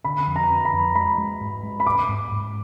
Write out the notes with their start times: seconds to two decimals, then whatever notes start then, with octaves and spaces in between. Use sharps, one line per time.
0.04 D3 B5
0.27 F2
0.36 A#5
0.50 D3
0.65 B5
0.73 F2
0.95 G#3 B5
1.18 G#3
1.41 G#2
1.63 G#3
1.80 B5
1.86 G#2 D6
2.09 G#2
2.31 G#2